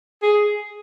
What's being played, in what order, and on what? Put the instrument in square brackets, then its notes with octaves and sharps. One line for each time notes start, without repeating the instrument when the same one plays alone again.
[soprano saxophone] G#4